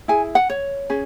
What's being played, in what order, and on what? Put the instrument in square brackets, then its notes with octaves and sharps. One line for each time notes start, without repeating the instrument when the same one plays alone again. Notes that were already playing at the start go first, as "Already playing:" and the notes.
[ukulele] E4 G#4 G#5
F#5
C#5
C#4 G#4